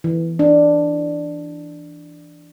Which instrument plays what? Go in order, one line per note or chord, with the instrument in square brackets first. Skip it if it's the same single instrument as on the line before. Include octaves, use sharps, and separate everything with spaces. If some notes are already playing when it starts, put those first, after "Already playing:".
[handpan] E3
D4